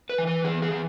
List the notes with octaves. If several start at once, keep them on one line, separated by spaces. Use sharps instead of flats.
B4
E3
B4
E3 G#4
G#4
E3